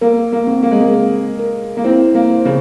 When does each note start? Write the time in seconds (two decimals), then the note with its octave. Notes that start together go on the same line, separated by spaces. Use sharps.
0.01 A#3 A#4
0.33 A#3
0.47 C4
0.63 A#3
0.71 G#3
0.81 A#3
0.94 A#4
1.39 A#4
1.77 A#3
1.84 C4 E4
2.15 A#3
2.30 C5
2.45 C#3